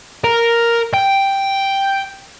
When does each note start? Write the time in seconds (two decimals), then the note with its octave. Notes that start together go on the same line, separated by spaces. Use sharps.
0.24 A#4
0.93 G5